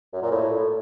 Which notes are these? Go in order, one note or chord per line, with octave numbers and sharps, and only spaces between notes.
F#2
A#2
A2